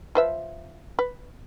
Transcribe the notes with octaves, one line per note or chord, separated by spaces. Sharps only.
F3 B4 E5
B4